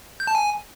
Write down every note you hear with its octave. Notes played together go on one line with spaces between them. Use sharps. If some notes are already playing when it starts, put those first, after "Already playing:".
G6
A5
G#5